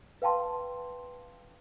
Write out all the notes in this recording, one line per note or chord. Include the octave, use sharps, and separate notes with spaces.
B4 F5 G5 A5 C6